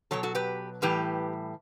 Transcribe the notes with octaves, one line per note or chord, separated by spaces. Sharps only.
B2 F#3 A4 C#5
F#4 A4
G4 B4
A2 E3 G3 G4 B4